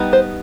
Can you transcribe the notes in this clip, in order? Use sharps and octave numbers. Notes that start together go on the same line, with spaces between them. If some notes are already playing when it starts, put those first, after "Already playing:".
Already playing: G3 B3 D#4
C5